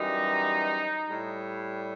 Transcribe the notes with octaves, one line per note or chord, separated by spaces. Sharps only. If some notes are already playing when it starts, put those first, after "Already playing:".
Already playing: F#2 E3 G3 D#4
A2 G3